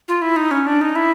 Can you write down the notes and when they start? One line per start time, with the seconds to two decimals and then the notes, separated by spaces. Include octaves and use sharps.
0.08 F4
0.22 E4
0.36 D#4
0.51 C#4
0.67 D4
0.81 D#4
0.95 E4